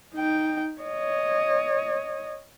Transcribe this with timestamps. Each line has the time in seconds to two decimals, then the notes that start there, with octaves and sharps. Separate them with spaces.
0.15 D#4 G5
0.81 C#5 D#5